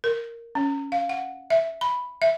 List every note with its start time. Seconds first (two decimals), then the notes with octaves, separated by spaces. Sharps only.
0.04 A#4
0.55 C#4
0.92 F5
1.09 F#5
1.50 E5
1.81 B5
2.22 E5